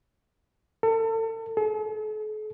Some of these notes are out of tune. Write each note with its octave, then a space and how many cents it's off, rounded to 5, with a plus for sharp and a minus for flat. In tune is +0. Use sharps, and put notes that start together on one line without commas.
A4 +35
A4 -45